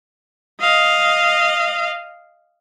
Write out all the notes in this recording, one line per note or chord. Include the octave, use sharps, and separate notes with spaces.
D#5 F5